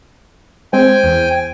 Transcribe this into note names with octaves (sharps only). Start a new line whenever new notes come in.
G#3 C4 C5 G5 G#5
E2